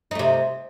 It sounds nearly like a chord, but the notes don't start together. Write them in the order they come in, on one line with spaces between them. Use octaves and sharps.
D#4 A3 C3